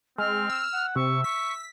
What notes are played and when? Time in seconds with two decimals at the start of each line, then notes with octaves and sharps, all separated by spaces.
0.18 G#3 C4 F6
0.50 E6
0.73 F#5
0.95 C3 E5 C#6
1.24 C#6 B6